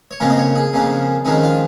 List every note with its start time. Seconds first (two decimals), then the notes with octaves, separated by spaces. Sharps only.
0.11 C#5
0.20 F2 C#3 A#3 C#4 A#4
0.30 D#5
0.38 C#5
0.55 G#4
0.73 F2 C#3 A#3 C#4
1.25 F2 D#3 G#3 C#4 D#4
1.43 F4